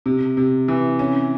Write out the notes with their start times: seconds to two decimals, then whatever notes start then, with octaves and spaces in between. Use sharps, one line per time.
0.06 C3
0.37 C3
0.68 E3
0.99 C#4